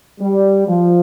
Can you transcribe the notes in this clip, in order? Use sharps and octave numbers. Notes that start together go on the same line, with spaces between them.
G3
F3